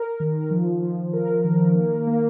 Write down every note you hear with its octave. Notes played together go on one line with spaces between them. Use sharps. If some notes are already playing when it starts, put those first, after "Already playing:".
Already playing: A#4
D#3
F3
F3
A#4
D#3
A#3
A#3